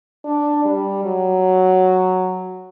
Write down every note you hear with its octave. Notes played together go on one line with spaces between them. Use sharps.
D4
G3
F#3